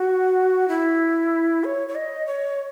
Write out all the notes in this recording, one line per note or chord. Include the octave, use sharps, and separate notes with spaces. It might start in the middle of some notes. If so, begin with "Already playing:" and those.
Already playing: F#4
E4
C#5
C#5
D#5
C#5